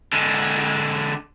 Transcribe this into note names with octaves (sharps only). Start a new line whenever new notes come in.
D3 G#3